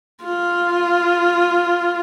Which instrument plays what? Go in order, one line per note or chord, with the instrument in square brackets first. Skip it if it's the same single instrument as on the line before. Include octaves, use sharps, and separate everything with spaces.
[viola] F4